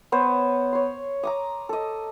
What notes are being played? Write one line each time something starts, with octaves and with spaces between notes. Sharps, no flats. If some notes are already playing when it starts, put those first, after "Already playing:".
B3 C5 C#5
C#5 C6
A#5 D6 D#6
A4 D#5